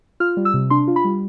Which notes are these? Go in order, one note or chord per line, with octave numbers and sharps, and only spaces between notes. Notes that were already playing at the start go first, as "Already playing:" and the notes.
F4 F6
G3
E6
C3
D4 C6
F4
B5
G3